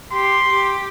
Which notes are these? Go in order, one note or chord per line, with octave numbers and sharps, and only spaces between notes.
G4 C6
G4